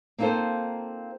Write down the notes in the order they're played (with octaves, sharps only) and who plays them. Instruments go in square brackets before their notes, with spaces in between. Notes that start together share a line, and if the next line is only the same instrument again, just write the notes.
[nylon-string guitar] A#3 C4 D#4 F4 A4 C5